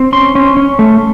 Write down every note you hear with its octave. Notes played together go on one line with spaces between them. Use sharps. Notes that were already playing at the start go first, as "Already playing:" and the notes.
Already playing: C4
C#4 C6
C#4
C#4
A3